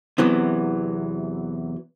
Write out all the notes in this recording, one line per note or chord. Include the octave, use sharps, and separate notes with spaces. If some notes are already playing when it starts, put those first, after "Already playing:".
E2 C3 E3 F#3 B3